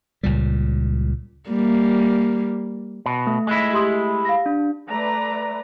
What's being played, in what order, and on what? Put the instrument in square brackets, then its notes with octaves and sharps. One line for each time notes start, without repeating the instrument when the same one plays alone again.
[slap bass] C#2 A#2 G3
[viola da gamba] G3 A#3
[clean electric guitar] B2
[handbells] A3
[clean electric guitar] G#3 E4
[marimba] G4 C6 D#6
F5 A#6
[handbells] D4
[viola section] A3 B4 D5 A#5